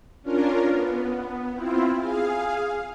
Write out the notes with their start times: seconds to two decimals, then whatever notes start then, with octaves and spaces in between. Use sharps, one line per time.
0.22 C#4 D4 F4 A#4
0.67 B3
1.54 C4 E4 F4
1.98 G#4 F5